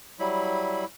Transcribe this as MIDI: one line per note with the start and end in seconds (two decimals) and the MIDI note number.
0.19 0.85 54
0.19 0.85 55
0.19 0.85 64
0.19 0.85 83